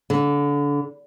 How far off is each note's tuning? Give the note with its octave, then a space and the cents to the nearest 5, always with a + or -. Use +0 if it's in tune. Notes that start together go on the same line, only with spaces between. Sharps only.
D3 -30